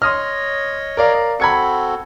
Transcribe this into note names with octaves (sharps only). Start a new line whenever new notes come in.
C#5 D#5 C6 D#6 F6
A#4 D5 F5
C4 F#4 A4 B5 G#6 C#7